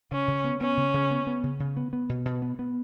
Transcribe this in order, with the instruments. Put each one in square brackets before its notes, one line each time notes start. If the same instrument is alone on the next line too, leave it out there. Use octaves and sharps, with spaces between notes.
[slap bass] C#3 [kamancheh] C#4
[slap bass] C#3
B3
[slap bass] B3 [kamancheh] C#4
[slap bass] C#3
C#3
B3
B3
C#3
C#3
B3
B3
B2
B2
B3
B3